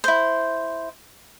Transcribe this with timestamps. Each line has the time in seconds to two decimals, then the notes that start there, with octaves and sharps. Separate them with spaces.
0.04 E4 C5